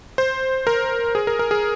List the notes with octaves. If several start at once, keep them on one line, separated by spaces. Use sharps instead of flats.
C5
A#4
G#4
A#4
A#4
G#4